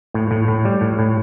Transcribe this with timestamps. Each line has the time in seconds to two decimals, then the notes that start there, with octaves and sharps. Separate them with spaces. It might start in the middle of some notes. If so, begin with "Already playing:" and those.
0.14 A2
0.31 A2
0.48 A2
0.65 G3
0.81 A2
0.99 A2